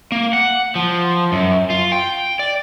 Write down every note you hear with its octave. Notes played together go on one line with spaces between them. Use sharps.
A#3
F#5
F3
F#2
F4
G5
D5